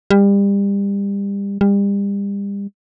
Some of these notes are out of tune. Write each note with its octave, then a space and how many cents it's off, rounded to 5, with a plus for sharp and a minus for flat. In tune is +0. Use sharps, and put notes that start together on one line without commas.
G3 +30
G3 +35